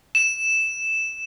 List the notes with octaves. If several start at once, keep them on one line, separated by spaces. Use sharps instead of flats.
E7